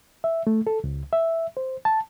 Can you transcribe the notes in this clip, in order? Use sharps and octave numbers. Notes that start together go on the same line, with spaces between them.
E5
A3
A4
C#2
E5
C5
A5